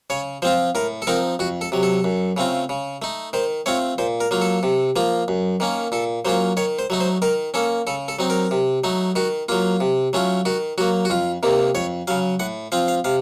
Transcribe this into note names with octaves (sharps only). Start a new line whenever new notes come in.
C#3 C#5
F3 C4 F4 C5
A2 A#4
A4
F3 C4 D#4 A#4
F2 F#4
A4
C3 F#3
A4
F#2
C#3 A3 C4 F4
C#3
A3 D#4
D#3 C5
A3 C4 F4 C#5
A#2 C5
A#4
F#3 A#3 F4
A4
C3
F3 A#3 F4
F#2
D#3 A#3 C#4
A#2 A4
F#3 A#3 C#4 F4 C5
D#3 C#5
C5
F#3 A3 D#4
C5
D#3 A#4
A#3 C#4 A4
C#3 A4
A4
F#3 C4 D#4
A#4
C3
F#3 A3 D#4
D#3 F#4
F#3 A#3 F4
C3
F#3 A3 C#4 F4
D#3 F#4
F#3 A#3 F#4
F#4
F2 F4
C3 D#3 A#3
F2 C#5
C#3 F#3 F5
A2 F#5
F3 C4 F4 F5
F5
C3 F5